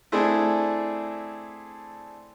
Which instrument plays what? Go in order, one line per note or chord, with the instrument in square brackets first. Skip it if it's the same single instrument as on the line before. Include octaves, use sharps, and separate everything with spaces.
[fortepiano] A3 C4 D4 E4 G#4